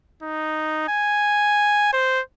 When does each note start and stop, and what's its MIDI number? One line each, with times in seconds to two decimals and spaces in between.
0.23 0.88 63
0.89 1.89 80
1.93 2.21 72